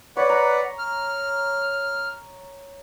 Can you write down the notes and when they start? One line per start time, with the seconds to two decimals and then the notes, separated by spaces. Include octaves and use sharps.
0.17 B4 C#5 D5 F#5
0.30 A#5
0.78 F6